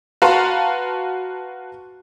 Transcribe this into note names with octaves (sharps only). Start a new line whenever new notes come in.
F#4 B4 F5 A5 A#5 C6